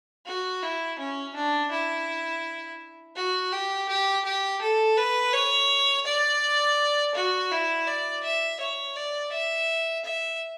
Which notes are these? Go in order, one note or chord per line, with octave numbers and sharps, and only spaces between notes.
F#4
E4
C#4
D4
E4
F#4
G4
G4
G4
A4
B4
C#5
D5
F#4
E4
D5
E5
C#5
D5
E5
E5